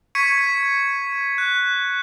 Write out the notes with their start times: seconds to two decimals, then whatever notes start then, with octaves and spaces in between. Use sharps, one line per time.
0.15 C#6 G#6 B6 C#7 D#7
1.38 F#6